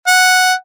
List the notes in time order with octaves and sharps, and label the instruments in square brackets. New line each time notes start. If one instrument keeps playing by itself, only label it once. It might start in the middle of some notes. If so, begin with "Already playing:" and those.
[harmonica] F#5